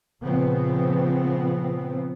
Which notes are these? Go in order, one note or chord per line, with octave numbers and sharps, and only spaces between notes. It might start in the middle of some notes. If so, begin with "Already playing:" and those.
A#2 C#3 F3 B3 C4